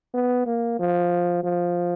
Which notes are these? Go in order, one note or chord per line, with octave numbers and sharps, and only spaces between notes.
B3
A#3
F3
F3